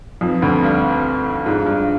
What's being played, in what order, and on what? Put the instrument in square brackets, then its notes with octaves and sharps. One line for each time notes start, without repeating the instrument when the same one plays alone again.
[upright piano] F2 F3 [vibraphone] C4 D#4 B4
[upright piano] D2 D3
G2
[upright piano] G#2 [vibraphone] D4 F4 G#4 D5 F5
[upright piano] G2